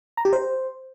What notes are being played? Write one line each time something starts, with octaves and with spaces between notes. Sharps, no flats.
A#5
G4
C5